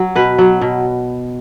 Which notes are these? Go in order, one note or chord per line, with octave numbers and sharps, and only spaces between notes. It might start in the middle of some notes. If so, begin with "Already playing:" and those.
Already playing: F#3
B2 B4
F#3
B2